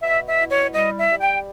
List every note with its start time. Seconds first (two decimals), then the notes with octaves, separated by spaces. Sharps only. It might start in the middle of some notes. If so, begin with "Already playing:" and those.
0.02 B2 E5
0.26 E5
0.37 E4
0.49 C#5
0.73 G3 D#5
0.97 E5
1.09 G3
1.20 G5